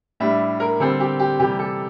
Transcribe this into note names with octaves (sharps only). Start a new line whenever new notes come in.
A2 G3 D4 E5
A#4
D3 G3 C4 A4
G4
G4
C3 E3 G3 G4
A4